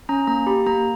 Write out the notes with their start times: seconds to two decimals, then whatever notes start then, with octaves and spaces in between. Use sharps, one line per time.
0.09 C#4 A#5
0.27 A#3 A#5
0.47 G4 B5
0.66 A#3 A#5